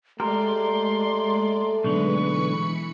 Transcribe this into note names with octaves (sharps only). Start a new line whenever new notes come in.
G#3 A3 G4 A#4 D5 C6
B1 D3 G#3 B4 C#6
E3 B5 C#7